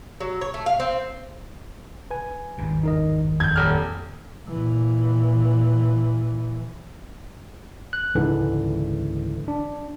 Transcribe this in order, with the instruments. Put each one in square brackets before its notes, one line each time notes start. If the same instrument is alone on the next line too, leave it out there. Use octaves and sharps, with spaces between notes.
[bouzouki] F#3
C#5
A3
F5
C4
[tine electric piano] B4 G#5
[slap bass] G#1 E2 G2
[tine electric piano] D#4 A#4 D#5
[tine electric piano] F2 [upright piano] G6 G#6
[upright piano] D#1 F6
[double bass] A#2 E3
[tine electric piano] F#6
C#2 G#2 D3 E3
D4